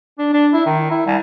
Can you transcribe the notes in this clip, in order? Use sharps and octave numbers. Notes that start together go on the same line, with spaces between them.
D4
D4
E4
D#3
E4
C2